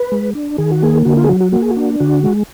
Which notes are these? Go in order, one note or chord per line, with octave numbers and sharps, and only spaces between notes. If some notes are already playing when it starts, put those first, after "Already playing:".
Already playing: B4
G#3
D4
D#3 G#4
F#4
A#3 G#4
D3 F#4
F4
G#4
F#3 F#4
F#4
A#3 F#4
G#4
F#4
D4
D3 F#4
G#3